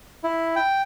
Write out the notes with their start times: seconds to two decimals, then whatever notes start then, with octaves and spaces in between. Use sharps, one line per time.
0.24 E4
0.56 G5